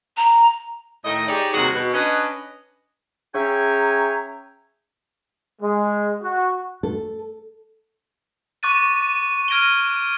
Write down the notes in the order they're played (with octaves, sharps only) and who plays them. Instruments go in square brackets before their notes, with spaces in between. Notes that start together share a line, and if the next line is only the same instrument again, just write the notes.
[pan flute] A#5
[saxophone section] A2 D#3 A3 D#5
D#4 G4 G#4 C#5 D5
D#2 C3 G3 F#4 G#4 F#5
B2
C#4 D4 B4 D#5
[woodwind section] C#4 G#4 E5 G5 G#5 A#5
[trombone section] G#3
F#4
[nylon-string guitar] A4
[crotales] C#6 D6 F#6 A6 D#7
F6 G#6 A#6 D7 D#7 G7